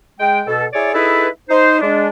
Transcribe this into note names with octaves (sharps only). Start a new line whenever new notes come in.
G#3 G5
B2 A4
E4 G#4 C#5 D5
D#4 E4 G#4 A4 B4
D#4 C5
G#3 D4